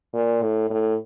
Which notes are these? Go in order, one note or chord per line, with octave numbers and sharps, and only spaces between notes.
A#2
A2
A2